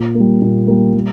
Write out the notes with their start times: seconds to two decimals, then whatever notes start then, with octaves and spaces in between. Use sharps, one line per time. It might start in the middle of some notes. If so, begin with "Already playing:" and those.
Already playing: A#2
0.15 A#3
0.20 G3
0.42 A#2
0.67 G3 A#3
0.94 G3